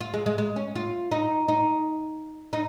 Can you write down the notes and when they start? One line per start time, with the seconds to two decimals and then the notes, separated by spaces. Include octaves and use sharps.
0.01 F4
0.14 G#3
0.26 G#3
0.38 G#3
0.56 C#4
0.75 F4
1.11 D#4
1.48 D#4
2.53 D#4